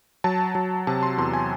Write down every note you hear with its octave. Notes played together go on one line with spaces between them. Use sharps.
F#3 A5
F#3
C3 A5
C6
E2 C6
G#5